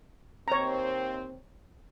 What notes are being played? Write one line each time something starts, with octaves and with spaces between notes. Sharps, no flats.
D#2 C4 C#5 A#5